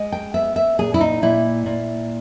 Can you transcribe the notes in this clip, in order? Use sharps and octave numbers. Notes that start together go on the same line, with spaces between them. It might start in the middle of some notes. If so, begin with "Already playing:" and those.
Already playing: G#3
G5
B3 E5
E5
A#2 G#4
E4
D#4
A#2 E4
A#2